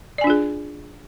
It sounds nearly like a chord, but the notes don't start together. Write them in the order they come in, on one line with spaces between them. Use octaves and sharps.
D5 G#5 D4 F4 G#4